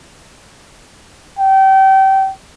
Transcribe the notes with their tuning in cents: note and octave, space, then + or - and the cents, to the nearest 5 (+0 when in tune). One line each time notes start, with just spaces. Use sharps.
G5 -30